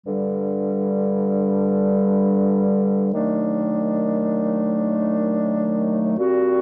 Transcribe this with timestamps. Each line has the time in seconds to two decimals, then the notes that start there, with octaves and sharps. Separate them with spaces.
0.06 G2 D3 G3
3.12 D#2 D#3 F#3 A3 D4
6.18 A#2 G3 C4 F#4